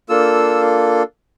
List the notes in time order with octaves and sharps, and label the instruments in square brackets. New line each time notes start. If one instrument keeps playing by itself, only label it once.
[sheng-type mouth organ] A#3 D4 F4 A4 E6